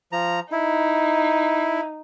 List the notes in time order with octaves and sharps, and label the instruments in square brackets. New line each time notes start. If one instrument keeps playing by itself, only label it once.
[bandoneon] F3 A#5
[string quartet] D#4 [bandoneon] E4